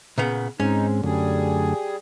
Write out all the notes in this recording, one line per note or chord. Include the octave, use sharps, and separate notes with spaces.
A#2 C#3 B3
G#2 G#3 C4 C#4 D#4
F#2 D3 G3 A3 G#4